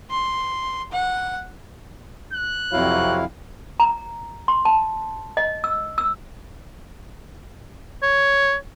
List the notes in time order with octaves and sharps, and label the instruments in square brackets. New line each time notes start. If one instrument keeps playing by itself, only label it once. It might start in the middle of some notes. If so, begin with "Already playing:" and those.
[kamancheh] C6
F#5
[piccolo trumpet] F#6
[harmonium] F2 E4 F5 [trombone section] C3 F#3
[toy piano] A#5
C6
A5
D#5
E6
E6
[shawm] C#5